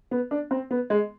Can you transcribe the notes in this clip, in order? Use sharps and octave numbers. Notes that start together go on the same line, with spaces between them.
B3
D4
C4
B3
G#3